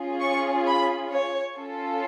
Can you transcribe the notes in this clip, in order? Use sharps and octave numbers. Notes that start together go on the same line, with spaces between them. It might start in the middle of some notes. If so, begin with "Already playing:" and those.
Already playing: C#4 F4 G#4
C#6
B5
C#5
C#4 F4 A4